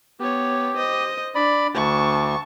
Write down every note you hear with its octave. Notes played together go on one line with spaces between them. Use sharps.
B3 G4 C#5
C5 D#5
D4 D5 B5
D2 A5 C#6